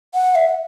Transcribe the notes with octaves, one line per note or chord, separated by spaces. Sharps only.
F#5
E5